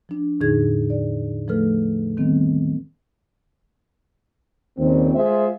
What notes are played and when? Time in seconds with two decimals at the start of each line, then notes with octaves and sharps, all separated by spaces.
0.09 F3 D4
0.40 E2 A2 D3 D#4 G#4 G#6
0.90 D5
1.48 F3 A3 A4 B4 F6
2.17 D#3 G3 B3 C4
4.78 D#2 A#2 C#3 F3 C4
5.16 G#3 F4 G#4 C5 E5